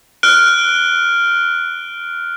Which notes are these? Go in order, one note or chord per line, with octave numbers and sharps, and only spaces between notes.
F6 F#6 D7 G7